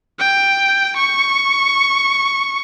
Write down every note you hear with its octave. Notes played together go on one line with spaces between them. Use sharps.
G5
C#6